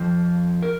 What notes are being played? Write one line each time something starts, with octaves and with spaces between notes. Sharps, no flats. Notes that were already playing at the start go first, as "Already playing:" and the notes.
Already playing: F2 F3
A#4